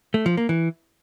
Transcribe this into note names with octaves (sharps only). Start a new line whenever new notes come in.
A3
F3
A#3
E3